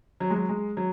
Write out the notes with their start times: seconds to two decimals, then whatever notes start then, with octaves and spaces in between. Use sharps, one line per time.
0.20 F#3
0.30 G#3
0.35 F#3
0.49 G#3
0.77 F#3